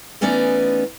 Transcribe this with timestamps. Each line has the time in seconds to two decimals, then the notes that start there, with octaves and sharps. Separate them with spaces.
0.21 E3 A3 B3 C#4 D#4 D5